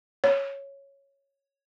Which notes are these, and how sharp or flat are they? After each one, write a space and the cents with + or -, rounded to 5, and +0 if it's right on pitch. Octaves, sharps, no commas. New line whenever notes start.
C#5 -5